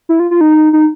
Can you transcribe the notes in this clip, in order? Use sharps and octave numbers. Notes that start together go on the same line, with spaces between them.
E4
F4
F4
D#4
D#4